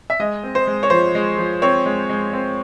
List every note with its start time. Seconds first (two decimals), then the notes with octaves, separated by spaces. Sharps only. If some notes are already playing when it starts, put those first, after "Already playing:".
0.10 E5
0.20 G#3 D#5
0.44 C4
0.55 C5
0.67 G#3
0.83 C#5
0.90 F3 C5
1.15 G#3
1.38 F3
1.62 C4 C#5
1.86 G#3
2.09 G#3
2.33 C4